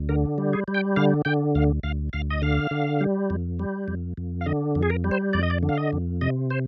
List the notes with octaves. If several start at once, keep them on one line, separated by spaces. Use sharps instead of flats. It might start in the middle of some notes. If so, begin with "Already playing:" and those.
Already playing: D2
D3 A#4
G3
G#4
G3
G5
D3 F5
D3 G5
D2 F5
D2 F5
D2 F5
D#5
D3 F5
D3
G3
F2
G3
F2
F2
F5
D3 D#5
F2
G#4
A#4
G3
C5
F2 D5
D#5
D5
D3
F5
D#5
F2
C3 D#5
C5